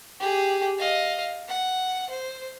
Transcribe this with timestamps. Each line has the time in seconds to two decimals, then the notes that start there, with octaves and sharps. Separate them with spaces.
0.20 G4 G#4
0.78 D#5 F5
1.48 F#5
2.10 C5